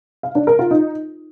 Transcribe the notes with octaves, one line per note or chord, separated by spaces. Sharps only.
F5
D4
A#4
F4
D#4